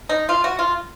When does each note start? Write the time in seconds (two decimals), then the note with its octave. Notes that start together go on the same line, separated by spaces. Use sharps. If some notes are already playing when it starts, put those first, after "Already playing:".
0.09 D#4
0.29 F4
0.44 F#4
0.59 F4